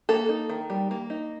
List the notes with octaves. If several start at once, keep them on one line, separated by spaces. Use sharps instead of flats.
A#3 A4
D#4
D#3
G3
A#3
D#4